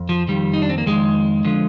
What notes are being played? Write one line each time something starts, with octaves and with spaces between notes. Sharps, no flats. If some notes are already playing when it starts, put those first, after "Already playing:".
Already playing: F2
F3
F2 D#3 G3
D#4
D4
C4
A#3
F2 D#3 G#3
D3 F3